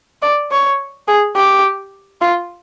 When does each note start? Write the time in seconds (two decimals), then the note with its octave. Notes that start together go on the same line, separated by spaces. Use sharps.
0.22 D5
0.51 C#5
1.08 G#4
1.36 G4
2.21 F4